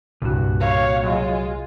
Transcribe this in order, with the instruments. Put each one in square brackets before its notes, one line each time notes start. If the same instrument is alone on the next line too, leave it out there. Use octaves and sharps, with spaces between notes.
[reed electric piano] C2 [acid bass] G2 [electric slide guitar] A#2 F#4
[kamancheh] C#5 F5
[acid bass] F#3 [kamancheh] G#3 F4